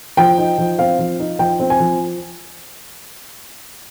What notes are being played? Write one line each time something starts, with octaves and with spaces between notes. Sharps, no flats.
F3 G5
D#4
F3
C4 F5
F3
D#4
F3 G5
C4
G#5
F3